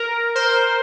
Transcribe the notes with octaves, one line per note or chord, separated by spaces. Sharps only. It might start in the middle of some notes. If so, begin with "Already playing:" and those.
Already playing: A#4
C5